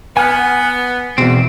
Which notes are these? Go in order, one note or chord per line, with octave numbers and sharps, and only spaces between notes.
B3 G#5 F6
E2 G#2 B2 C4